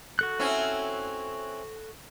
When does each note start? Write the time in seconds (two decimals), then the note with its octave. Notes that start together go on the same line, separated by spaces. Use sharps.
0.19 F#4 A4 F#6
0.39 C4 C#4 E4